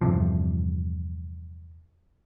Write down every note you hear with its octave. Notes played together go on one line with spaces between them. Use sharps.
E2 G2 C3 F3